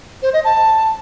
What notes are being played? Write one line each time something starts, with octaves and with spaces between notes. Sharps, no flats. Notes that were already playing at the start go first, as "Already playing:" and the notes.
C5
D#5
A5